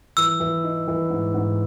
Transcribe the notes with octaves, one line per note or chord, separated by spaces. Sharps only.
E3 E6
E3
D#4
E3
G#2
G#2